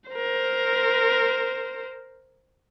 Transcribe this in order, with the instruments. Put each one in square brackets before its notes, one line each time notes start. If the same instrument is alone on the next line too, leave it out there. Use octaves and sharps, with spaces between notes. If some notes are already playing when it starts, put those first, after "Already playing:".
[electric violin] A#4 C5